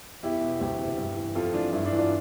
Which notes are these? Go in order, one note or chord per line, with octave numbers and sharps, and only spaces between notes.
E2 E4 G4
B2
D2 E4 G4
C3 E3
G2
E3
F2 F4 A4
E3 D4 F4
G2 E4
D4
E3
D4 F4